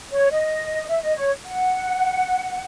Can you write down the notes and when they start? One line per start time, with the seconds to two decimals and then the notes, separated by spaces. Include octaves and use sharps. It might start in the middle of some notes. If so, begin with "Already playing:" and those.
0.12 C#5
0.31 D#5
0.88 E5
1.02 D#5
1.16 C#5
1.46 F#5